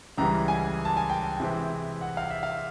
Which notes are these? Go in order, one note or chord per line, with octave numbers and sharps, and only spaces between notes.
C#2 C#3 E3 G3 A#5
G#5
A5
G#5
G5
C3 E3 G#3 C4
F#5
F5
E5
F5